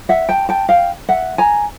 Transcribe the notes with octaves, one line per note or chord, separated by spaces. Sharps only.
E5 F#5
G5 A5
G5 A5
F5 G5
E5 F#5
G#5 A#5